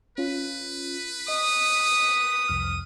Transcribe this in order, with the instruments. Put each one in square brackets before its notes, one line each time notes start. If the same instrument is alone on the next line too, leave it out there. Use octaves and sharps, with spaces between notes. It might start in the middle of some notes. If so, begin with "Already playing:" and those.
[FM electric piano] C#4 F4 [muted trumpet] B4
[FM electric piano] D#5 [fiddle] D#6
[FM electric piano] B6
C2 F2 F6